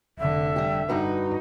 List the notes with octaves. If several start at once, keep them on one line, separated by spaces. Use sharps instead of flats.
F1 D3 E5
G3 G4
G2 D#4 F#4 B4